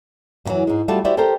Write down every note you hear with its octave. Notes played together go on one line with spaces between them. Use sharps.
F#2 A#2 D#3 E3 F#3
G#2 G#3
G3 A3 F4 F#4 A5
E4 F#4 G4 C5 D5 E5
G4 A4 A#4 C5 G5